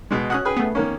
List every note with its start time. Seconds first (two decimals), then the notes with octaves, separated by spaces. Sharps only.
0.11 B2 G#3
0.30 C#4 F#4 D#6 F#6
0.45 G#4 B4 G5
0.57 A3 B3
0.75 D#3 A#3 C#4